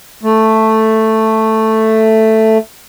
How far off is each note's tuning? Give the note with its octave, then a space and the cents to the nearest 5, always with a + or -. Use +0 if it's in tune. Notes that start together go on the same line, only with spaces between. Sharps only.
A3 +5